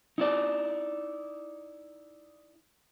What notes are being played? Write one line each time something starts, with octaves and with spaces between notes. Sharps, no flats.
D#4 E4 D5